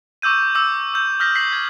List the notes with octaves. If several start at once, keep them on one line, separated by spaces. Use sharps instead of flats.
C#6 D6 E6 G6 D#7
D6 E6 D#7
D6 E6 G6
D#6 F6 G6 A#6 B6
B6 C7 F#7
G#6